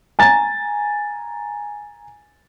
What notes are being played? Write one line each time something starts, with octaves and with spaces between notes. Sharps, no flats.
G#5 A#5 A6